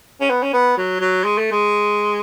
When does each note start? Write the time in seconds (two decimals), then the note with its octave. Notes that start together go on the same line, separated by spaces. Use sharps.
0.21 C#4
0.29 B3
0.42 C#4
0.53 B3
0.77 F#3
1.00 F#3
1.24 G#3
1.37 A3
1.51 G#3